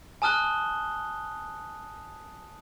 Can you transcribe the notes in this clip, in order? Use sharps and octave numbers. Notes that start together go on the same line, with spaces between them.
G#5 A5 D#6 F6 F#6 G7